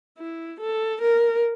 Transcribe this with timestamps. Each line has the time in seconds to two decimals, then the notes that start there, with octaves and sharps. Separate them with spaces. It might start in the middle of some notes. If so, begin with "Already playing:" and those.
0.19 E4
0.60 A4
1.02 A#4